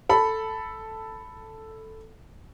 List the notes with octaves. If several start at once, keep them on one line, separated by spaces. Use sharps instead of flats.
A4 B5